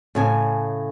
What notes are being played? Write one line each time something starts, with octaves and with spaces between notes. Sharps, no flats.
A2 C#3 G#5